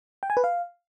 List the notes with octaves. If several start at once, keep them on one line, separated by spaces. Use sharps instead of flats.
G5
G#5
B4
F5